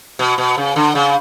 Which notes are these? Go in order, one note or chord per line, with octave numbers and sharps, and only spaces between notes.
B2
B2
C#3
D3
C#3